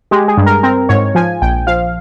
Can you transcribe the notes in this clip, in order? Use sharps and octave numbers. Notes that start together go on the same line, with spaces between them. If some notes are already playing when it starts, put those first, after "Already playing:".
G#3 G4
G#4
G2
A#4
C4 A#4
G#2 C#5
F3 G#5
A#1 G5
F3 F5